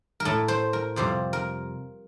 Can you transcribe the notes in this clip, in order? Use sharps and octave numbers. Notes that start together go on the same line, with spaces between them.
A#4
A2 A3 A4
C5
A#4
F2 C3 G3 C5
A#4